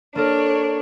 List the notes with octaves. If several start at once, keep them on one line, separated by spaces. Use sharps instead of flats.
A#3 D4 A4 A#4 C#5